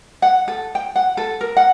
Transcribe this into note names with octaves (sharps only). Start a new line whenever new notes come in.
F#5
A4
G5
F#5
A4
A#4
F#5